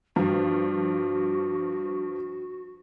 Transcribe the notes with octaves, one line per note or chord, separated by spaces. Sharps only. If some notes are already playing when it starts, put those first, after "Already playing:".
G2 F3 F#4